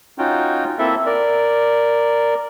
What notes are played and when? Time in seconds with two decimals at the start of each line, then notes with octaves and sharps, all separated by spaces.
0.18 C#4 D#4 F4 F#4 G5
0.79 A#3 C4 E4 A4 E5
1.06 A#4 D5